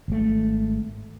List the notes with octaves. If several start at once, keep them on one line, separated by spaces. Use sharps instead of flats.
G#1 A3